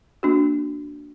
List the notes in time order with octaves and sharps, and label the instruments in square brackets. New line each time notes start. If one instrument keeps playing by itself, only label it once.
[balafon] A#3 D4 F#4